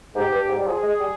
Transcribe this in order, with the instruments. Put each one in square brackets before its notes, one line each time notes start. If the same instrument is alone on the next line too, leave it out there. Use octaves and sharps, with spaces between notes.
[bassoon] G#2 [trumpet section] G4
[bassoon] G2
G#2
G3
[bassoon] F3 [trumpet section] G#4
[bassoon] G#3
G3